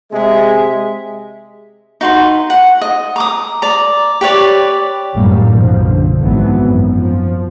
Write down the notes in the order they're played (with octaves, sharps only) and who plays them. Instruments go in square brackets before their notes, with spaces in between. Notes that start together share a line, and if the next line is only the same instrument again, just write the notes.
[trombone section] C3 G#3 [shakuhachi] E5
[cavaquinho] D#4 F#4 B4 C6
F#5
D#5
A#5 D6 D#6
D5 A#5
G4 B4 C#5 D5
[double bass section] G#1 F#2 A2 G3 A#3
B1 B2 F3
D3
G#1 E3 F#3 B3
F#2
F3